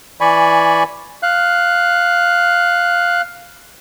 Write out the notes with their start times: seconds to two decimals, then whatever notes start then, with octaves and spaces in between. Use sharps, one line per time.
0.21 E3 D5 G#5 B5 C#6
1.23 F5 F#6